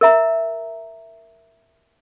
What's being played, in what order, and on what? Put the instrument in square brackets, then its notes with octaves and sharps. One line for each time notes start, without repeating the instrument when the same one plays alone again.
[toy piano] A#4 E5 A#5